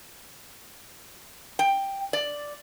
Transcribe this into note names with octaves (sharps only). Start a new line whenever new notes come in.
G5
D5